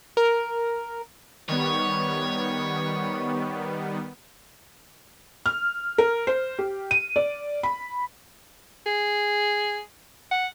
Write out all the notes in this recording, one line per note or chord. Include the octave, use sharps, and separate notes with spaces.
A#4
D#3 G3 B3 C#5
F6
A#4
C5
G4
D#7
D5
B5
G#4
F#5